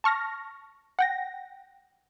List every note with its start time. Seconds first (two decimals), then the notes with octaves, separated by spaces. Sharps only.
0.04 A5 C#6 F6 A#6
0.99 F#5 G5 A#6